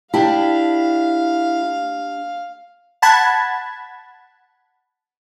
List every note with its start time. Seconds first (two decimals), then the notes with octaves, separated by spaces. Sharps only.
0.14 D4 E4 G4 F5 A5
3.02 F#5 A5 B5 G#6